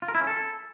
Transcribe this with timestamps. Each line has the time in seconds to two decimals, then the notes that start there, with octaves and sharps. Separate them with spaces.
0.02 F4
0.08 A#4
0.15 E4
0.21 C#4
0.27 A4